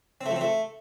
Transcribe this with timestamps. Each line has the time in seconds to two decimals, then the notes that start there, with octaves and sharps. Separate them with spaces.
0.21 C4
0.26 A3
0.31 F3
0.36 C4
0.41 A3